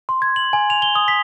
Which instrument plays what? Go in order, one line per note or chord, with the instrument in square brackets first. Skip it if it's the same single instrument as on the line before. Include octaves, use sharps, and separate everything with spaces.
[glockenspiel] C6
G#6
F#7
G#5
F7
G7
D#6
B6